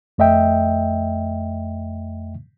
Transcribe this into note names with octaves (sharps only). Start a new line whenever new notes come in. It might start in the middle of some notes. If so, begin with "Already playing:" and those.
F2 A3 D#5 E5 G5